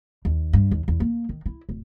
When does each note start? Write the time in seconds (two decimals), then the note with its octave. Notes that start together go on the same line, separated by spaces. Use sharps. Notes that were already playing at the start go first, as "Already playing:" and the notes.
0.25 D#2
0.53 G2
0.71 D#2
0.88 E2
1.00 A#3
1.29 D#3
1.46 E4
1.69 D1